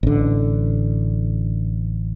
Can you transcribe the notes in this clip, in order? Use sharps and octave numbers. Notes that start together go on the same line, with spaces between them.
A1 D3